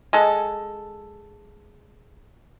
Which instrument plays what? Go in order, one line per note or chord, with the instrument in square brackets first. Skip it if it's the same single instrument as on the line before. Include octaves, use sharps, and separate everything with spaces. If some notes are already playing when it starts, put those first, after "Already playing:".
[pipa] G#3 A4